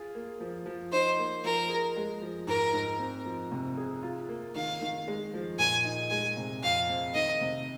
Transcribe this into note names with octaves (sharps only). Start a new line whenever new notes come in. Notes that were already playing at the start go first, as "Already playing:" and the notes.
Already playing: F4 G#4
A#3
F3
F3
D#4 C5
A#3
F3 A#4
G#4
G#3
F3
G#2 A#4
G#2
C4
F3
C3
G#4
F4
A#3
D#3 F5
D#3
G#3
F3
A#2 G#5
D#4
G#3 G#5
C3
F2 F5
C4
D#3 D#5
C3